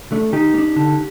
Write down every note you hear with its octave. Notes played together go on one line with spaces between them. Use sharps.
A3 D4
D#3 D#4 G4
A#3
D4
D3